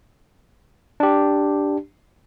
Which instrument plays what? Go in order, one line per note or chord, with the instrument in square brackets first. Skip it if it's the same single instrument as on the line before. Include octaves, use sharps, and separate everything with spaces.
[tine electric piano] D4 G4